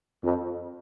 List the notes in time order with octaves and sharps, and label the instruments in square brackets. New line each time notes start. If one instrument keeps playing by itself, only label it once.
[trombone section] F2